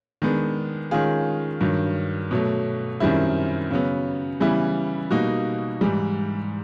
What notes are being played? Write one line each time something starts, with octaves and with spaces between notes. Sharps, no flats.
D#3 G#3 B3 D4
D#3 G#3 C#4 F4 G#4
G2 D#3 F#3
B2 F#3 A3
F#2 D#3 G3 C4 E4
C#3 F#3 B3
C#3 E3 G3 B3 E4
B2 G3 A#3 D#4 F#4
G#2 E3 G3